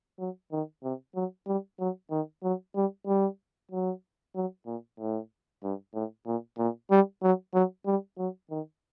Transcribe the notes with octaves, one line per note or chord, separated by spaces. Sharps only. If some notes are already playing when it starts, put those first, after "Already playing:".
F#3
D#3
C3
F#3
G3
F#3
D#3
F#3
G3
G3
F#3
F#3
A#2
A2
G2
A2
A#2
A#2
G3
F#3
F#3
G3
F#3
D#3